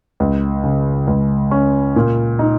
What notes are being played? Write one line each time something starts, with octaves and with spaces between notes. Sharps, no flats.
C#2
C#3
C#2
C#4
A#2
D#4